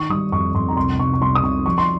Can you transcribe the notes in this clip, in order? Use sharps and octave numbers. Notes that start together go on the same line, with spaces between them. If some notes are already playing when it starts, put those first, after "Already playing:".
Already playing: D#3 C#6
G3 D#6
F2 C#6
F2 C6
A#5
C2 C6
C2 C#6
C#6
C2 C6
D#6
C2 C#6
F3 C#6
C6